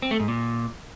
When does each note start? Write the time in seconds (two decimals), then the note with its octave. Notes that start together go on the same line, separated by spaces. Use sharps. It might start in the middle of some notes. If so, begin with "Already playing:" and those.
0.02 C4
0.11 A3
0.20 G#2
0.28 A#2